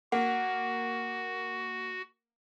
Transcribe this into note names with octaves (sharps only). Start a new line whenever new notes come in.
A#3 F#4 F#5